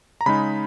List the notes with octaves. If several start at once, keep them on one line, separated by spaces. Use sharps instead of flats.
A#5
C#3 G#3 D#4 B5